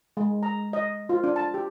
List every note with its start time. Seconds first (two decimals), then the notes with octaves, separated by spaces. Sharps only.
0.17 G#3
0.43 A#5
0.73 D#5
1.09 F4
1.24 D4
1.36 A5
1.54 G4